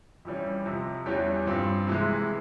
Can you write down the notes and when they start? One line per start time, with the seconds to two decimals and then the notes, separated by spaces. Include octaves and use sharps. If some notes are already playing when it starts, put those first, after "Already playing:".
0.25 F2 E3 G3 C#4
0.66 F2 C3 F3
1.06 E2 E3 G3 C#4 G4
1.47 G2 F3 C4
1.87 C3 E3 G#3